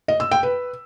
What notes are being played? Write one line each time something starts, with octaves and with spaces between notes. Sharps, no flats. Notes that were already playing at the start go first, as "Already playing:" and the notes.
D#5
E6
G5
B4